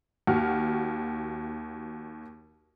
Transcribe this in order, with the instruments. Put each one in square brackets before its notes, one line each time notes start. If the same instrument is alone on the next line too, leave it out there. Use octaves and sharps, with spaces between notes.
[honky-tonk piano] D#2 F#4 F6